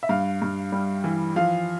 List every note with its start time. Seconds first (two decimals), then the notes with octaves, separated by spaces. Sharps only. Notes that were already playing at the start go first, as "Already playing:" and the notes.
0.03 E5
0.09 G2 F5
0.42 G2
0.72 G3
1.04 E3
1.36 F3 F5